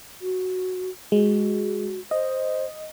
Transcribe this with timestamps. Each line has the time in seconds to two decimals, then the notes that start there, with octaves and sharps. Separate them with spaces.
0.21 F#4
1.12 G#3 F#4
2.11 C5 D#5